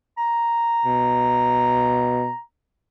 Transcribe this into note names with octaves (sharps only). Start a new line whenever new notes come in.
A#5
B2